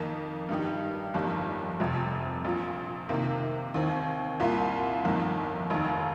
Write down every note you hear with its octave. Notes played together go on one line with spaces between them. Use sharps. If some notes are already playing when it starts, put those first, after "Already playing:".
Already playing: F2 D#3 A#3 D#4
G2 D#3 G3 D#4 G4
G1 F2 D#3 G3 A#3
F1 F2 C3 F3
A#1 A#2 F3
C3 D#3 A#3
D#2 D#3 C4
C2 A#2 A#3 F4
G1 F2 D#3 A#3
F1 D#2 D#3